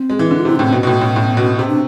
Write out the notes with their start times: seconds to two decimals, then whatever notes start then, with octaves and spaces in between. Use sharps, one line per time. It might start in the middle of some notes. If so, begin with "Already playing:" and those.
Already playing: C4
0.10 G#3
0.19 E3
0.31 D3
0.39 F4
0.45 C3 E4
0.56 A2 D4
0.65 C4
0.73 B2 B3
0.83 B2
0.87 A2
1.01 A2
1.16 A2
1.37 B2
1.59 C3 C4
1.69 D4